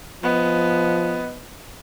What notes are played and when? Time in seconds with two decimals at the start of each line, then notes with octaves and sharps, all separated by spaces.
0.23 F3 B3 D#5